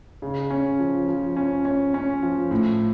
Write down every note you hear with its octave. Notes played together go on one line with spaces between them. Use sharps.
C#3
C#4
F3
F3
C#4
C#4
C#4
F3
A2